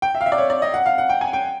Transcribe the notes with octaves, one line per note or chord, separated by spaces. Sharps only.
G5
E5
F5
E5
D5
C#5
D5
D#5
F#5
F5
F#5
G5
G#5
G5